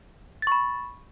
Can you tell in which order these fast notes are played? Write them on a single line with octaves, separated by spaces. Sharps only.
A6 C#6 B5